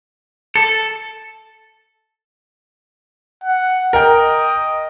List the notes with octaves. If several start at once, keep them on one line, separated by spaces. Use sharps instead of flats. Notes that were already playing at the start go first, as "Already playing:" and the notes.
A4
F#5
A#4 D#5 G5